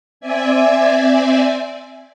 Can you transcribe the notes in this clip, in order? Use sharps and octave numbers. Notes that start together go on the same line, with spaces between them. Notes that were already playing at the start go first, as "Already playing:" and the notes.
C4 D5 E5 G#5